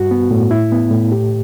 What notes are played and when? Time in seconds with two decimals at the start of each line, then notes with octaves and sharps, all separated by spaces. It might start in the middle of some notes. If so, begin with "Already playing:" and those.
Already playing: G2 F#4
0.11 B3
0.31 A2
0.51 E4
0.72 B3
0.91 A2
1.12 G4